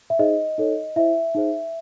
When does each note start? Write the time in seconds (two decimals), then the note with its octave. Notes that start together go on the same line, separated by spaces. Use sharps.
0.10 E5
0.19 D#4 G#4 C5 D#5
0.58 D#4 A4 C#5
0.96 E4 C5 E5
1.34 D#4 G#4 C5